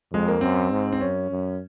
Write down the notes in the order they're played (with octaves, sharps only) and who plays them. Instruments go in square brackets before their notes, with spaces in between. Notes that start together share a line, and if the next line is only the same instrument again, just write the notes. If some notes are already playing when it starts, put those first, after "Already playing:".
[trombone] F2 [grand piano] G#3
[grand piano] A#3
[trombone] F#2 [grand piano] C4
[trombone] G#2
[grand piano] C4
[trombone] F#2 [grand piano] C#4
[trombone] F#2